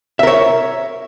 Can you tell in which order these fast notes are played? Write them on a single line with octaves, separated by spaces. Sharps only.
E5 A#4 C#5